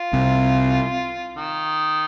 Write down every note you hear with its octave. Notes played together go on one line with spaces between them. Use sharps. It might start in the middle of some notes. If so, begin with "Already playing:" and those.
Already playing: F4
C2 C3
D#3